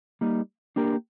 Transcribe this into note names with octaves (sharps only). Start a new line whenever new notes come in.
G3 A#3 D#4
A#3 D4 G4 A#4